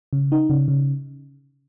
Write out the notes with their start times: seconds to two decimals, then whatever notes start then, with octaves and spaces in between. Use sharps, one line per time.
0.13 C#3
0.32 D#4
0.50 C#3
0.68 C#3